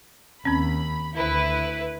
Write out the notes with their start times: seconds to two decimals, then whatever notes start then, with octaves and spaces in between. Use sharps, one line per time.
0.45 D#2 C4 C#4 B5
1.17 D2 E4 B4